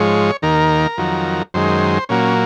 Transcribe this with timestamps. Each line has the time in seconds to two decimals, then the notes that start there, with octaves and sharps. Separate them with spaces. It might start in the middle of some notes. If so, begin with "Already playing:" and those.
Already playing: G#2 F3 G#3 C#5
0.42 D#2 D#3 A#3 A#4
0.98 F2 D#3 F#3
1.54 F#2 D#3 G#3 C5
2.09 A#2 F#3 A#3 C#4